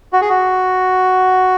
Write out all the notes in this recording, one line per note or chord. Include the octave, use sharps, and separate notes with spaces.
F#4
G#4
F#4